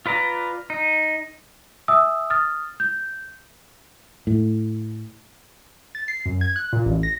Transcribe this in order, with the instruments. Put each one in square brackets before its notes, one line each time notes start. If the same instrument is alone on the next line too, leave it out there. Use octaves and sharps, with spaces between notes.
[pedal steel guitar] F4 B4 D5 A#5
D#4
[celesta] E5 G#5 D#6 E6
D#6 F6 A6
G6
[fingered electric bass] A2
[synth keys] A6
C7
F#2
G#6
F#6
A#2
A1
A#6